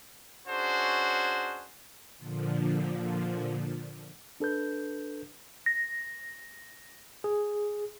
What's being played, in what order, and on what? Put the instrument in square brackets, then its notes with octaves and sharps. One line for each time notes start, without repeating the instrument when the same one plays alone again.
[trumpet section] C#4 D4 F#4 G#4 C5
[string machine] A#2 D3 F3
[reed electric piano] D4 A4 B4 G6
[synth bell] A#6
[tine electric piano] G#4